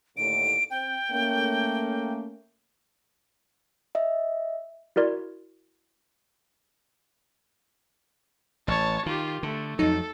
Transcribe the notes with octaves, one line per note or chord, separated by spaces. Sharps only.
D#2 A2 D3 D7
C4 G5
A3 A#3 C#4
D#5 E5
E4 F#4 A#4 D5 C6 G#6
A1 C#5 A5
D#3 F4 G4
D3 A3
F2 F#3 D#4 A4